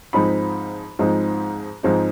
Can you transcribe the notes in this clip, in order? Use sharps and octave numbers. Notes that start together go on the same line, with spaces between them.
G#2 F3 G#3 C4 D#4 B5
G#2 F3 G#3 C4 D#4
G#2 F3 G#3 C4 D#4